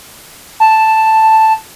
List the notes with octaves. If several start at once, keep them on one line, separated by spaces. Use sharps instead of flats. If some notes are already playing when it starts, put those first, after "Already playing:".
A5